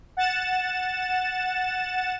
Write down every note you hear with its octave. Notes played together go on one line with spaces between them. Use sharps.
F#5 A6 E7